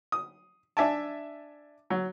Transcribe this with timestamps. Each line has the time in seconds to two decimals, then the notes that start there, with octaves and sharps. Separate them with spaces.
0.12 D#6
0.77 D4 E5 G#5 A5
1.90 F#3